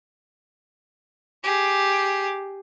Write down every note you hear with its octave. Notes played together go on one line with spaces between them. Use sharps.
G4 G#4